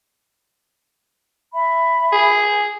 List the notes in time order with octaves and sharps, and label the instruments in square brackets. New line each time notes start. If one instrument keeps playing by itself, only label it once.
[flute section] E5 B5
[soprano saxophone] G#4